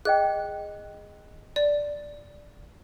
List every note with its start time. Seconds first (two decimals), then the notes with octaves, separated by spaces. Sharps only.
0.05 G#4 D#5 G5 F#6
1.56 D5